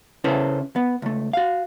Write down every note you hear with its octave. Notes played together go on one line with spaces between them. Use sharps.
C#3 C#4 E4 A4 B4 C5
B3
C#2 A3
F#4 F5